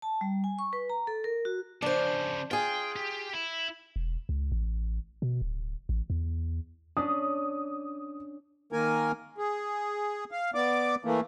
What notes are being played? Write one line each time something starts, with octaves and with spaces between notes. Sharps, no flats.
A5
G3
G#5
C#6
B4
A#5
A4
A#4
F#4
C#3 F3 D4 C5
F4 G#4 G5
G4
E4
E1
C#2
A1
B2
D1
A1
E2
C#4 D4 D#6
D#3 A#3 A#4 G#5
G#4
F5
B3 D5 D6
E3 A3 A#3